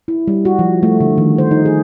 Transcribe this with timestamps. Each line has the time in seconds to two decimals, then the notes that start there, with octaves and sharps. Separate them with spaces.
0.08 E4
0.27 G3
0.45 F#4
0.59 F3
0.83 A3
1.00 D3
1.18 D#3
1.38 C5
1.51 D#4
1.65 G#4